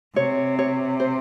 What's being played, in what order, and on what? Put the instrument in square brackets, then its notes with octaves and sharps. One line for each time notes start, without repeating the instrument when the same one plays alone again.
[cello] C3 [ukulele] C#5
[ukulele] C#5
C5